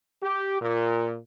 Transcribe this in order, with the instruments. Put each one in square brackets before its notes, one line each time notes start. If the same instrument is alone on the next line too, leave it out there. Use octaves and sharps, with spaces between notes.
[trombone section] G4
A#2